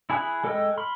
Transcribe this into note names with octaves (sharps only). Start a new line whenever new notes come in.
E4 G#4 G#5 B5 F#6
G#3 A4 D#5 G5 E6
B5 C6 F6